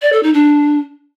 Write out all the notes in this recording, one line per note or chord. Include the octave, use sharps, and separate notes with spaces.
D5
A4
D#4
D4